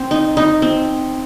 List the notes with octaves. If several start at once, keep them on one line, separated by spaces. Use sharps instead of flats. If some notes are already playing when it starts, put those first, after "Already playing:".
Already playing: C4
D#4
D#4
C4